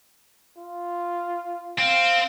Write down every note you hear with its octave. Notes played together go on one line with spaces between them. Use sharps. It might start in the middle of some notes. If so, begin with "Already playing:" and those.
F4
C4 F5